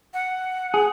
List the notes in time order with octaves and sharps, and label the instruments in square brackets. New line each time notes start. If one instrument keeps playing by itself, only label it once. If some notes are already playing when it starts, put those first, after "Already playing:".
[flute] F#5
[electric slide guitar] G#4